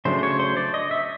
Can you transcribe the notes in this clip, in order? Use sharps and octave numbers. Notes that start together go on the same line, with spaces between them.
C#3 F#3 A3 D4 C5
C5
C#5
C5
D5
D#5
E5